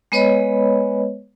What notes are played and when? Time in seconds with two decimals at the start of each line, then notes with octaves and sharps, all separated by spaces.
0.12 G#3 B3 B4 C#5 D#5 B5